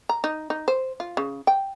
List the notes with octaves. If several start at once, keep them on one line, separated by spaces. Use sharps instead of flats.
A#5
D#4
D#4
C5
F4
C#3
G5